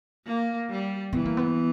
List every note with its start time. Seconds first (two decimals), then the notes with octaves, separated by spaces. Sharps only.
0.26 A#3
0.69 G3
1.13 E3 B3
1.25 A#3
1.37 B3